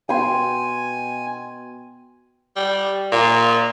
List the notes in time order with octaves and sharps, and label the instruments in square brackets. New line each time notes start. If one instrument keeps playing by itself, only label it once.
[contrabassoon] B2 [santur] G5 C6 [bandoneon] G#5
[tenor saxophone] G3
A#2